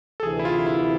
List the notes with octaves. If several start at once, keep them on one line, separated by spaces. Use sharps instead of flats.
A4
D2 C3 E3 G#4
E4
F4
E4